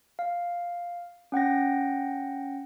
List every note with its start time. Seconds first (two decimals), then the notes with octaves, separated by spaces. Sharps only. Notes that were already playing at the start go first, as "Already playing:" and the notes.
0.19 F5
1.32 C#4 F#5 G5 A#6